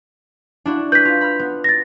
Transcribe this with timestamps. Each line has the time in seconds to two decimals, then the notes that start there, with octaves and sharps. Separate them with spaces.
0.66 D4 E4 F#4
0.92 B4 G6 B6
1.05 F4
1.21 B5 F6
1.39 B3
1.64 A6 A#6